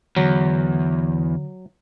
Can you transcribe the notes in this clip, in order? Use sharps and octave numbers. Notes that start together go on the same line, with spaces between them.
E2 D3 F#3